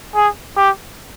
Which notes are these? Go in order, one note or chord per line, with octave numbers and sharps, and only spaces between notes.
G#4
G4